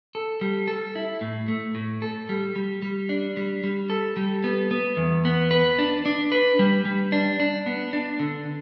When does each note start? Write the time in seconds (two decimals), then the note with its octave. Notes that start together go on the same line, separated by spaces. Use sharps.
0.15 A4
0.41 G3
0.68 A4
0.95 E4
1.21 A2
1.48 A3
1.75 A2
2.02 A4
2.29 G3
2.56 G3
2.82 G3
3.09 D4
3.37 G3
3.64 G3
3.90 A4
4.17 G3
4.44 B3
4.71 B3
4.97 E2
5.25 B3
5.51 B4
5.79 D4
6.06 D4
6.32 B4
6.59 G3
6.85 G3
7.12 D4
7.40 D4
7.66 B3
7.93 D4
8.19 D3